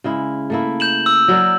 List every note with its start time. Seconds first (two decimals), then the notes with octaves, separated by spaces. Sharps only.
0.04 C#3 G#3 E4
0.50 A3 A#3 E4
0.80 G6 E7 F#7
1.06 E6
1.28 F#3 A#4 D5